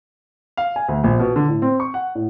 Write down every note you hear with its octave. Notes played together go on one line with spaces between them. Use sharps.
F5
G#5
D2
A#1
B2
D3
A2
C4
C#6
F#5
A2